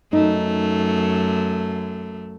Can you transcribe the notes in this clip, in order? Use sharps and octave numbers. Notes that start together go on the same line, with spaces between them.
F#2 A3 D#4